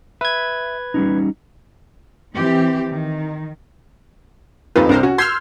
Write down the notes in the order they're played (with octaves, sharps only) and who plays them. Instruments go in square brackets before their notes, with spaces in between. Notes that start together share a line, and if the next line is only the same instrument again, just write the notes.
[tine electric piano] B4 G#6 [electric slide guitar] E5
[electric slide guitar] G3 C#4 D#4
[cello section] E3 C4 G4
D#3
[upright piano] D#1 F2 B4 [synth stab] A3 D#4 F4
[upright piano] C2 [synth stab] D4 A#4 C5
[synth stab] C#4 [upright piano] F#4
[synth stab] C6 E6 F6 [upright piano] G6 G#6 C7